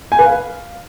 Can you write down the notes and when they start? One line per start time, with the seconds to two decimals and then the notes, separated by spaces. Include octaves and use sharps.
0.12 G#5
0.19 B4
0.26 F5